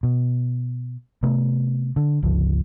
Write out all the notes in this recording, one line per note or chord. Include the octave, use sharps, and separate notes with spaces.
B2
C3 A3 B3
D3
G1 C#2 F3